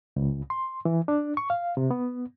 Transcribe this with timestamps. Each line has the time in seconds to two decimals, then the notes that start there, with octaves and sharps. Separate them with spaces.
0.16 C#2
0.50 C6
0.85 E3
1.08 D4
1.37 C#6
1.50 F5
1.77 C3
1.91 B3